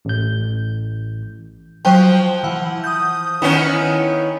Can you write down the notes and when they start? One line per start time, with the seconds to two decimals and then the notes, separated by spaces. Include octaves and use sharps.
0.05 A1 G6
1.85 F3 F#3 C5 G5
2.43 E3 F#5
2.84 D#6 G6
3.42 D#3 B3 C#4 E4